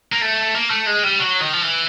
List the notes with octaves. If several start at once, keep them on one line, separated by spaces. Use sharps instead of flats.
A#3
A3
A#3
A3
G#3
G3
F#3
D#3
F3
E3